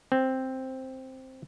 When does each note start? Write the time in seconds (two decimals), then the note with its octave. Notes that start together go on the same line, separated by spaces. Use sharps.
0.12 C4